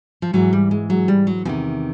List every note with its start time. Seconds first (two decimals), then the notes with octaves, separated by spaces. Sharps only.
0.22 F3
0.33 G#2 E3 F#3
0.53 G3
0.71 G#3
0.90 F#3
1.08 G3
1.27 F#3
1.45 E2 C3 D#3 F3